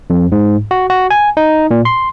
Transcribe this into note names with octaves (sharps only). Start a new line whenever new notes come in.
F2
G#2
F#4
F#4
G#5
D#4
A#2
C6